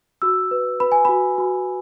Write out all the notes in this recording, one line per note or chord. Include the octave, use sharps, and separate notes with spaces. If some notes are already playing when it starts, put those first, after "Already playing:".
F#4 E6
B4
B4 B5
G#5
F#4 B5
F#4